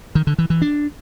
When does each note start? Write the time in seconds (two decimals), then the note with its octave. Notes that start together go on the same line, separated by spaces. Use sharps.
0.15 D#3
0.27 D3
0.38 E3
0.50 E3
0.62 D4